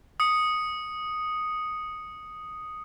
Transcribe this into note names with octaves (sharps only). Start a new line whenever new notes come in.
D#6 C#7